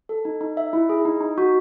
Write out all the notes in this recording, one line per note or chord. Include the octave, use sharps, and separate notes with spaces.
A4
D#4
D#4
E5
E4
G#4
D#4
D#4
F#4